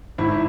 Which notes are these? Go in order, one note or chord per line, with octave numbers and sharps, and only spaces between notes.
G#1 E4